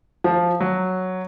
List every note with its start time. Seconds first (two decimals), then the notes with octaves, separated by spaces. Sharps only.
0.24 F3
0.61 F#3